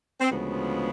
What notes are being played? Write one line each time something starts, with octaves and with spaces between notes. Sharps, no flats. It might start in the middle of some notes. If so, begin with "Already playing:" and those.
C4
D2 C#3 F3 G#3 B3